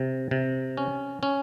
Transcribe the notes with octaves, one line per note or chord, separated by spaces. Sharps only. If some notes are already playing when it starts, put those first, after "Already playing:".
Already playing: C3
C3
C#4
C#4